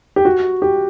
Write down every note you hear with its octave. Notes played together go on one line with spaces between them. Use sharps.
G4
F#4
G4